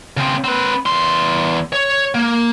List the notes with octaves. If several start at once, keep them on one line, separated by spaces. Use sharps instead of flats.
C#3 C4
C4 B4
E2 C6
C#5
A#3